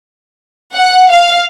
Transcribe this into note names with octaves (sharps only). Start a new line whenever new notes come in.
F#5
F5